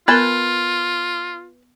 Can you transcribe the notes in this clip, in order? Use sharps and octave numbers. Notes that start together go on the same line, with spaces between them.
B3 F4 A#4 B4 A5